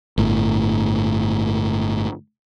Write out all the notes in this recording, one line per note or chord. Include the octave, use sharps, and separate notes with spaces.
G1 A2